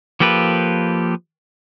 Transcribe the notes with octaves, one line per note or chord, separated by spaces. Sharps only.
F3 A#3 G4 A4 B4